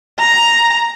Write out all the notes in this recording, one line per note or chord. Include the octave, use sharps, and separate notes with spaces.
A#5